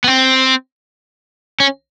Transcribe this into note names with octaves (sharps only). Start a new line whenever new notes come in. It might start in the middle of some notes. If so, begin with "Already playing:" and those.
B3
C4
C#4